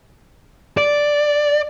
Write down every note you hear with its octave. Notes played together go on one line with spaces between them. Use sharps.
D5